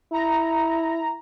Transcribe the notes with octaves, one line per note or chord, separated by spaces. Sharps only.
E4 A#5